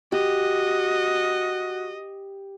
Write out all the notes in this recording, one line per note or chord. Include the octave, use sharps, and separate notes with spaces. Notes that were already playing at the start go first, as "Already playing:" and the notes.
F#4 G4 D#5